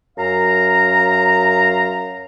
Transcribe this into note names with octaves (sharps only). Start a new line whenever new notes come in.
F#2 F5 A#5